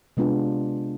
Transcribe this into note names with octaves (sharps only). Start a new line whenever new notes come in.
C3 G#3 B3 D4 F4